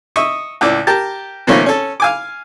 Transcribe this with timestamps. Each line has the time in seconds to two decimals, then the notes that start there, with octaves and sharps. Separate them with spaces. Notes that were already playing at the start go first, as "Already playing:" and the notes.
0.16 D#5 E5 C#6 D#6
0.61 C#2 A2 D5
0.87 G4 A#4 A5
1.47 B2 D#3 F3 A3 A#3 C#4
1.66 C#4 A4
2.00 F5 G#5 D6